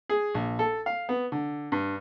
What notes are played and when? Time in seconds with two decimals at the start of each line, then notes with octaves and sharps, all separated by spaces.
0.09 G#4
0.35 A#1
0.59 A4
0.86 F5
1.09 B3
1.32 D3
1.72 G2